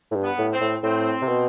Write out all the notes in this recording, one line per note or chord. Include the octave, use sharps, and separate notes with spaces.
A2
G2
B3
A2
C4
A2
A2 C4
C3
B2